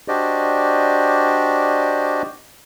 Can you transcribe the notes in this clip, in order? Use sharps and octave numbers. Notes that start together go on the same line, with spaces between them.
D4 F#4 G4 C5 D5 D#5